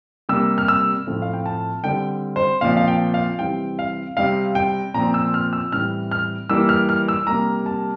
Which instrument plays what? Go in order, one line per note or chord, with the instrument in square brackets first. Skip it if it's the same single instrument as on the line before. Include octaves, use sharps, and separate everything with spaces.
[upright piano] C3 G3 A#3 E6
F6
E6
A2 F3 A3 C4
F5
G5
A5
D3 G3 C4 G5
C5
A#2 F3 C4 F5
F5
G5
F5
C3 E3 G3 C4 G5
F5
C3 G3 C4 F5
G5
A#2 F3 C4 A#5
E6
F6
E6
A2 E3 G3 C4 F6
F6
E3 G3 A#3 E6
F6
F6
E6
C3 G3 A#3 A#5
A5